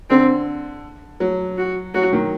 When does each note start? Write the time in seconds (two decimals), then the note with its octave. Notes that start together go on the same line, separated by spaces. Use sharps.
0.10 D3 C4
1.20 F#3
1.58 F#4
1.94 F#3 F#4
2.13 D#3